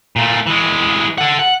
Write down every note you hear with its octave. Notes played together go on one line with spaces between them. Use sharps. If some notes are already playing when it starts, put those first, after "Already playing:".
A#2 A3
E3 G#3
A4 F#5
F#5